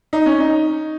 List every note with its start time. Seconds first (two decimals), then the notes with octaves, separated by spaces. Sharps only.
0.13 D#4
0.26 C#4
0.40 D#4